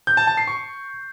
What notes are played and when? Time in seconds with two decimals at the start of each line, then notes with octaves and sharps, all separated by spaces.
0.07 G6
0.17 A5
0.27 A5
0.37 C7
0.47 C#6